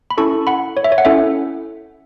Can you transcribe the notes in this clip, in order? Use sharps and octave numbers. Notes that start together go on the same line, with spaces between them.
B5
C#4 E4 A4 A5 C#6
F#5 B5
C#5
E5
C#5
F#5
C#4 E4 A4 E5